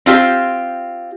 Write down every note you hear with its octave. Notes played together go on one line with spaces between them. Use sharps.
C4 F4 G4